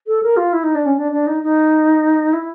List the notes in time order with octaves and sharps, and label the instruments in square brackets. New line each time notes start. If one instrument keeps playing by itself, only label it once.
[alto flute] A4
A#4
F4
E4
D#4
D4
C#4
D4
D4
D#4
D#4
E4